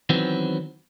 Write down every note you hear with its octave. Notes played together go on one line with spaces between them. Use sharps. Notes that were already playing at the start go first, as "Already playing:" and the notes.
D#3 E3 F#3 B3 C4